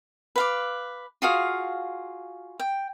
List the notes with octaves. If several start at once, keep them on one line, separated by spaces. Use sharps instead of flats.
B4 F5 D6
F4 F#4 G#4 F5
G5